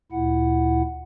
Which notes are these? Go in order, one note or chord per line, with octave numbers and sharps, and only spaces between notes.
D2 A#2 E4 F#5